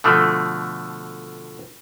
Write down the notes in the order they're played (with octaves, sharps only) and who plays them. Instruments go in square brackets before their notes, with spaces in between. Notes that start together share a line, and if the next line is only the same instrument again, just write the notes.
[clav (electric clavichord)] B2 D3 F3 A3